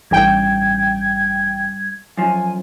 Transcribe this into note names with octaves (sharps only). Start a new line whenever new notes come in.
A1 G2 G5 G#6
F#2 F3 G#5